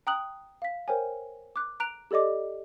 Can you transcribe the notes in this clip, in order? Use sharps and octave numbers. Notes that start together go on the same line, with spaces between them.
G5 A#5 D#6 F#6 F#7
F5 B6
A#4 C5 C#5 G5 G#5
D6 F#6
A#5 F#6 D7 F7
G4 A4 D5 D#5 D6